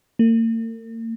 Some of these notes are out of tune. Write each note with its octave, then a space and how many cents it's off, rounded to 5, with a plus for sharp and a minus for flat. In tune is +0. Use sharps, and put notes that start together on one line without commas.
A#3 -45